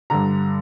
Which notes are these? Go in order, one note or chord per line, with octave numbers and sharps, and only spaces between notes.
G2 D3 A#5